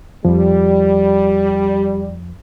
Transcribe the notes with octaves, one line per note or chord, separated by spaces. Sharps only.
F2 F3 G3